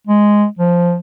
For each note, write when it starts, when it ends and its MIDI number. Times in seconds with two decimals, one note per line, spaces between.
0.07 0.46 56
0.59 0.98 53